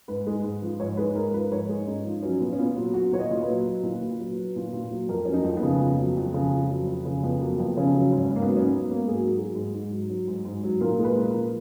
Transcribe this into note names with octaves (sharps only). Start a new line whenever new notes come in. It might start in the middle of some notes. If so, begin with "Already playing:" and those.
G#2 B4
G#3
G#2
F3
G#2 C#5
G#3 B4
G#2 A#4
F3 B4
G#2 C#5
G#3
G#2 D#4
F3
F#3 C#4
A#2 B3
C#4
A#2 B3
F#3 F4
F#3 F#4
A#2 C#5
D#5
A#2
B4
F#3
F#3
A#2
A#2
F#3
F#3
A#2
A#2
F#3
F2 A#4
F#3 C#4
D#4
F2
B3
C#3
F2
F#3
F2
C#3
F2
F#3
F2
C#3
F2 B3
F#3 A#3
F2 B3
C#3 C#4
F#3 C#4
G#2
C#4
G#2
A#3
B3
F#3
C#4
F#3 B3
G#2
A#3
G#2 G#4
F#3 F#4
F#3 G#4
G#2
G#2
F#3
F#3
G#2
G#2
F#3
A#2 A#4
G#3
B4
A#2
A#4
F3